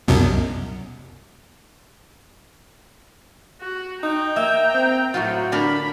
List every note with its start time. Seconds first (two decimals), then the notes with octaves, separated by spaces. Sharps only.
0.08 C2 F#2 B2
3.61 F#4
4.03 D#4 G5 A#5
4.36 A#3 E5
4.74 C4
5.14 A2 F#3 F4 F#4
5.52 D3 D4 A#4 B5